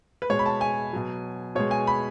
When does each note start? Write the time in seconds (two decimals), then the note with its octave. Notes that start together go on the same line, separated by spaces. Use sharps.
0.22 B4
0.30 B2 G#3 C#5
0.39 B5
0.46 A5
0.61 G#5
0.93 B2 F#3
1.55 B2 G#3 C#5
1.71 G#5
1.87 B5